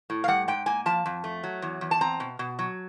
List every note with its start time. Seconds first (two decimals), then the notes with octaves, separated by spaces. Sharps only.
0.10 A2
0.24 F5
0.28 G3 F#5
0.48 G#2 G5
0.66 A#3 G#5
0.86 F3 A5
1.06 F2
1.24 A3
1.44 F#3
1.62 E2
1.81 E2
1.91 A5
2.01 C4 A#5
2.20 B2
2.39 B2
2.59 F#3